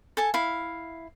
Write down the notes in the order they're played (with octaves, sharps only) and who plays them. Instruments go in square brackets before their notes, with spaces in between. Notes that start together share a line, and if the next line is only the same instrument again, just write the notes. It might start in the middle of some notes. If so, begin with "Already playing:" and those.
[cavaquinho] A4 G#5 A5
E4 F5